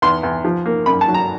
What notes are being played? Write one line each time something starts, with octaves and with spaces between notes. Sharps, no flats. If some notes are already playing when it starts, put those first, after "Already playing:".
E2 C6
E2
F3
A#3
F#2 B5
A5
F#3
A#5